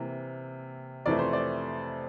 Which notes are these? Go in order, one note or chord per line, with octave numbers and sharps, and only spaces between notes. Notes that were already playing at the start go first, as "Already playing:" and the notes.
Already playing: C3 E3 A#3
F2 C3 E3 A3 D5
C5
D5